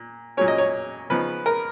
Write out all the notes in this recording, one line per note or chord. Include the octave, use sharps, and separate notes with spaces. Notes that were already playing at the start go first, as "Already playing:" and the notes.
Already playing: A#2
A#2 F#3 C#4 C#5
D#5
C#5
C#3 F3 B3 D#4 B4
A#4